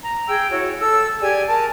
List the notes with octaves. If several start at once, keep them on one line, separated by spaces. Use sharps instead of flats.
A#5
G#4 G5 E6
E4 F#4 C#5
A4 E6
G4 G#4 D5 G#5
A#4 A5